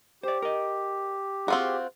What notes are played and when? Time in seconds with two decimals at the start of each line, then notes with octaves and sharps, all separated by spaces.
0.23 G4 C5 D5
0.42 A#4 D#5
1.48 C4 F4 F#4 G#4 F#5